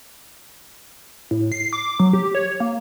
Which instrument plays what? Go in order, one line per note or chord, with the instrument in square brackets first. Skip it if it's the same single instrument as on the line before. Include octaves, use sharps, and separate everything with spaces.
[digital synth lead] A2
C7
D6
F#3
G4
C#5
A#3